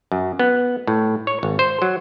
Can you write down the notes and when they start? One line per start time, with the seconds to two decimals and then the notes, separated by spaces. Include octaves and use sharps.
0.12 F#2
0.39 B3
0.87 A2
1.27 C#5
1.43 G#1
1.59 C5
1.82 F#3